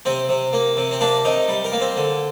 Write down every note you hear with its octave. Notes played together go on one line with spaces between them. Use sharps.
C3 C4
C3
A#3
C3
C4
A#3 D4
C3 D#4
G3
A#4
A#3
C4
D3